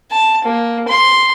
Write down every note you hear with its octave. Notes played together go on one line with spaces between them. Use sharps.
A5
A#3
C6